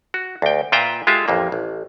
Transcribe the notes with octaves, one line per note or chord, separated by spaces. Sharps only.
F#4
D2 G5
A#2 F4 B4 E5 G5 A#5
G#3 F4 G4 A4 E5
A1 F2 A#3
A1